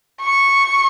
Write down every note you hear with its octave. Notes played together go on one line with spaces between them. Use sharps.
C#6